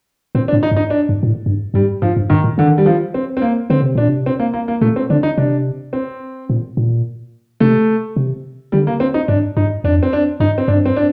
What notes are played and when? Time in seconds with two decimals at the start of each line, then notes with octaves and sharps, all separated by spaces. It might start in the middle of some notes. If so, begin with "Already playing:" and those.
0.35 A#2 C4
0.48 D4
0.53 A2
0.63 D#4
0.71 G2
0.77 D#4
0.90 D4
1.09 G2
1.23 A#2
1.28 A2
1.46 G2
1.74 G2 G3
2.02 G2 F3
2.17 G2
2.30 G2 D#3
2.44 A2
2.58 D3 D#3
2.78 G3
2.86 F3
3.14 C4
3.37 C4
3.42 A#3
3.70 D3 C4
3.82 C3
3.95 A#2 D4
4.09 C3
4.26 C4
4.39 A#3
4.54 A#3
4.68 A#3
4.81 A#2 A3
4.96 C4
5.10 D3 D4
5.23 D#4
5.38 C3 D4
5.93 C4
6.50 A#2
6.77 A#2
7.60 C3 A3
8.16 C3
8.72 D3 G3
8.87 A#3
9.00 C4
9.14 D#4
9.28 G2 D4
9.57 G2 D#4
9.84 F2 D4
10.03 C4
10.13 D4
10.40 G2 D#4
10.58 C4
10.68 G2 D4
10.85 C4
10.97 D4